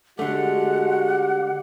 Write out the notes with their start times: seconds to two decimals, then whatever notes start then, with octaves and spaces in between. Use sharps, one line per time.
0.19 D3 G#3 A3 F#4 G4 F#5